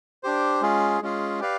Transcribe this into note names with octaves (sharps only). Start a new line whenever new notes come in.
D4 G4 C5
G#3 C#4 F4 G#4
G#3 C#4 F4 G#4
G4 B4 D5 F5